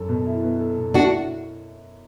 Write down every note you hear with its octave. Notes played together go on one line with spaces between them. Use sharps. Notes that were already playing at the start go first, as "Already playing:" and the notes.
Already playing: F#2 A4
B2
E4
B3
A4
B2
D4 E4 F#4